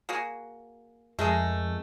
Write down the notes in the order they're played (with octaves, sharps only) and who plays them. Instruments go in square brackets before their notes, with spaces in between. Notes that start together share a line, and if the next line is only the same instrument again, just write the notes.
[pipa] A#3 F#4 G#4
[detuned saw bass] F2 [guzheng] G#3 A#4 [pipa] A3 G#4